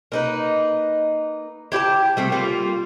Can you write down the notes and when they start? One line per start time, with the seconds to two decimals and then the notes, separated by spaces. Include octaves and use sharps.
0.12 A#3 D#4 B4
1.72 E4 G4 G5 A5
2.17 G3 A3 C4
2.32 G3 A#3 F4